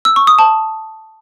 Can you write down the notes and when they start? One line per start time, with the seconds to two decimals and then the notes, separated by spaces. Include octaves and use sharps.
0.05 E6
0.16 C#6
0.27 D#6
0.39 A5